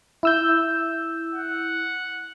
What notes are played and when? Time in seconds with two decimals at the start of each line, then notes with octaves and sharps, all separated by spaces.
0.23 E4 E6 G6
1.35 F#5